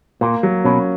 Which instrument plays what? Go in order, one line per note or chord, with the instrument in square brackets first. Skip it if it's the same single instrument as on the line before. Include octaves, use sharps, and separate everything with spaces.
[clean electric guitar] A#2 [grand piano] A#3
[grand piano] F#3
[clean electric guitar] B2 [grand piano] C#4